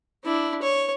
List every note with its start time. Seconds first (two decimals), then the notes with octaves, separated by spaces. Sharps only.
0.24 D4 E4
0.62 C#5